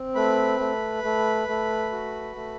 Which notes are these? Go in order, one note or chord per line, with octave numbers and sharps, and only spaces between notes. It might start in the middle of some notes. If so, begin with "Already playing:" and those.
Already playing: C4
A3 B4 B5
A3
A3
A3
F#4
A3